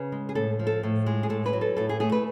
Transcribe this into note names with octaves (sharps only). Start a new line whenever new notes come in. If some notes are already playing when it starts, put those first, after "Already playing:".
Already playing: C#3 B4
G#3
G#4
A2 A4
F3
A4
A2
G#3
G#4
A2 A4
B4
F#3
A4
A2 A4
G#4
A3 G#4
B4